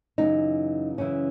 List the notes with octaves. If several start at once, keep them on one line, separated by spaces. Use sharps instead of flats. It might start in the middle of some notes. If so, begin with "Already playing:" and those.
F#2 C#3 E3 D#4
F#2 C#3 E3 C#4